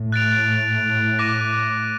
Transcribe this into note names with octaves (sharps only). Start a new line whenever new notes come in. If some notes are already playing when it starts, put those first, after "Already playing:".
Already playing: A2
F#6 A6 D7 F7
D6 F#6 A#6 D#7